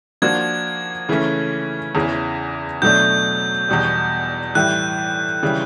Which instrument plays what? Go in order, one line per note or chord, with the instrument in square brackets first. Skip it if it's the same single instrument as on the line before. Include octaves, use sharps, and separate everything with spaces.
[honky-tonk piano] F3 A#3 D4 F#4 [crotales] G#6
[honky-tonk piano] C#3 E3 A3 C#4
E2 C#3 E3
[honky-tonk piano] B2 F#3 A3 D4 [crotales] G6
[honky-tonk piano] E2 B2 G3
[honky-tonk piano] A2 E3 G3 [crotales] F#6
[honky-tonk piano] C#3 E3 G3